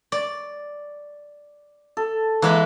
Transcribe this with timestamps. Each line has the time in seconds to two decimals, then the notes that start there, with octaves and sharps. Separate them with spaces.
0.12 D5
1.97 A4
2.42 E3 G#3 A#3 B4